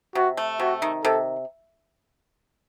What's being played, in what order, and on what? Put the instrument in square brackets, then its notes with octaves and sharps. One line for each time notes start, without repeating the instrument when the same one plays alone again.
[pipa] C3 [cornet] F#4
[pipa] A3
[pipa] C3 [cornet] F#4
[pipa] D#3
[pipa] C3 [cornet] A4